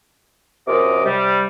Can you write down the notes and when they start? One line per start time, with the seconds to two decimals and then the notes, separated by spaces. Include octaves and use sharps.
0.67 F#2 C3 F4 A#4 D#5 D6
1.04 C3 G3